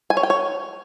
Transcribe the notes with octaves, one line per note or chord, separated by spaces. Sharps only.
G#5
C#5
G5
C#5